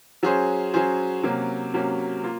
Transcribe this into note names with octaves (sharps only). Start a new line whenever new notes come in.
F#3 C#4 G#4 C5
F#3 C#4 G#4 C5
C3 F#3 A#3 C#4
C3 F#3 A#3 C#4
A#3 F4